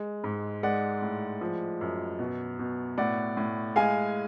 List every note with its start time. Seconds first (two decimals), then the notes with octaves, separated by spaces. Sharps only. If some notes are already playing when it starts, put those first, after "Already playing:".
Already playing: G#3
0.24 G#2
0.63 G#3 D5 F#5
1.02 A2
1.41 F3
1.81 F#2
2.19 B2
2.59 B2
2.98 A2 D5 F#5
3.37 A2
3.76 G#3 F5 G#5